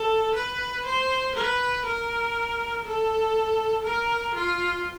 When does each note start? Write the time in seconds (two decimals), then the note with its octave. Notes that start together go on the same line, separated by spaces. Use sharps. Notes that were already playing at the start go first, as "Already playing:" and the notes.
Already playing: A4
0.35 B4
0.86 C5
1.35 B4
1.85 A#4
2.85 A4
3.84 A#4
4.35 F4